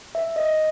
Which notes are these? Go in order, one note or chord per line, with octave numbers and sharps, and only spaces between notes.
E5
D#5